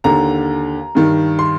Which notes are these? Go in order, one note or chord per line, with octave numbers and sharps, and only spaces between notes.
D#2 D3 A#5
G2 D#3
C6